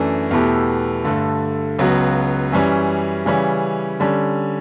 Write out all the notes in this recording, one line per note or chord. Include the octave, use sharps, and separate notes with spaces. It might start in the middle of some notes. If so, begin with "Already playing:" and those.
Already playing: F#2 E3 A3 D4
E2 B2 A3 E4 G4
G2 D3 A3
C#2 C#3 F#3 B3 F#4
F#2 E3 G3 C#4
C#3 E3 G3 C#4
D3 G3 C#4